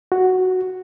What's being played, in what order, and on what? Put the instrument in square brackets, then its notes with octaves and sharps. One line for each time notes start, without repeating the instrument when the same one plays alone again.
[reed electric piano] F#4